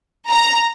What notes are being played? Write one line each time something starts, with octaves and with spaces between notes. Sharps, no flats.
A#5